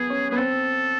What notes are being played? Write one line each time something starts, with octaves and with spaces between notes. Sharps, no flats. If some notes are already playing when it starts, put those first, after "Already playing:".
Already playing: B3 G#4
C#4
B3 G#4
C4 A4